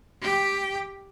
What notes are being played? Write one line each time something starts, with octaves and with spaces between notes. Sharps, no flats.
G4 G5